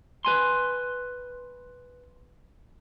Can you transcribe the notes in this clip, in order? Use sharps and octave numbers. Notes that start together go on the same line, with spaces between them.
B4 G#5 C6